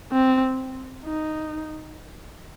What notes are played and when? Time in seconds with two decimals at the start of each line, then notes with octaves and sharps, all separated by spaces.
0.12 C4
1.05 D#4